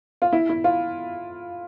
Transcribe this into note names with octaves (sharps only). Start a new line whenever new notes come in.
F4
E4
E4
F4